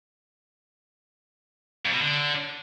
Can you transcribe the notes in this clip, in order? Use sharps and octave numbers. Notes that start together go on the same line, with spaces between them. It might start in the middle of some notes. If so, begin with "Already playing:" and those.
F2
B2
D3